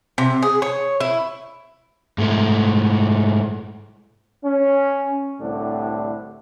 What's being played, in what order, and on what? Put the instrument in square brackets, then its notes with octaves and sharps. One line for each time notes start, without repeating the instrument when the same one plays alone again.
[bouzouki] C3
G#4
C#5
E4
[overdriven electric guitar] G#2 A3
[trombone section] C#4
C2 A2 D3 D4 G4